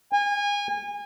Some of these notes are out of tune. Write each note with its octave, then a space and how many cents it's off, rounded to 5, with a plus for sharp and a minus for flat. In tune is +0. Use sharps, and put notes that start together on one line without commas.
G#5 -30